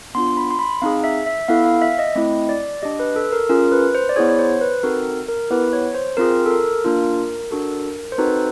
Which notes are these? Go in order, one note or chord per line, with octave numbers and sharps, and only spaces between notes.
B3 D4 F4 C6
B5
C6
B5
C4 D#4 G#4 F5
E5
E5
B3 E4 A4 F5
F5
E5
D#5
A3 C4 E4 D#5
D5
D4 G4 D#5
B4
A4
A#4
C#4 F4 G#4 A#4
B4
C5
D5
B3 E4 G#4 C#5
C#5
C5
B4
C4 D#4 F#4 A4 A#4
A#4
B3 E4 G4 B4
C#5
C5
C4 F4 G#4 A#4
A4
A#4
A#3 D4 F4
D4 F#4 A4
C5
C4 D#4 F#4 A4 B4